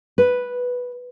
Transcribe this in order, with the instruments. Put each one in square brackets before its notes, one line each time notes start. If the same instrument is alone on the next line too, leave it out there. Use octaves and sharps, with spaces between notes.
[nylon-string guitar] B4